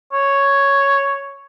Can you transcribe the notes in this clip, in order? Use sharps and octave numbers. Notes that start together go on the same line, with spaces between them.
C#5